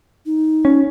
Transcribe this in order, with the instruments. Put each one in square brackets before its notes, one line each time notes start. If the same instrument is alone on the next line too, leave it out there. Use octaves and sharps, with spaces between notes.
[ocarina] D#4
[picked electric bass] C#4